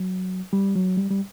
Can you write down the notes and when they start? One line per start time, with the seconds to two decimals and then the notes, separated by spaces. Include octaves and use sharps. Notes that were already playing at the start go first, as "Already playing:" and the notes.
Already playing: F#3
0.53 G3
0.75 F#3
0.97 G3
1.10 G3